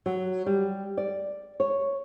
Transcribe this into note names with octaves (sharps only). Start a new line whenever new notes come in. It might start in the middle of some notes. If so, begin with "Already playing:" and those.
F#3
G3
D5
C#5